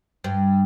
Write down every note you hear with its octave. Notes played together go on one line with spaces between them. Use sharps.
G2